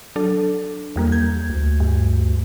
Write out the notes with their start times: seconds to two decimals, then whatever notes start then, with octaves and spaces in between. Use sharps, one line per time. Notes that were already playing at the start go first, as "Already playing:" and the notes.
0.16 F#3 D4 A4
0.96 E2 G3 A#3
1.12 G6 G#6
1.49 D2
1.80 G2